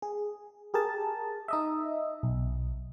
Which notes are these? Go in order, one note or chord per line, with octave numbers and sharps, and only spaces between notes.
G#4
G4 G#4 A#4 A5
D#4 D#5 E5
B1